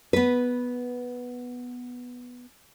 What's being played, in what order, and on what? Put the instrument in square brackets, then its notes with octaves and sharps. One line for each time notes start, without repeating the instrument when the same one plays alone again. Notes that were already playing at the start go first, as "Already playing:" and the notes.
[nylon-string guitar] B3 B4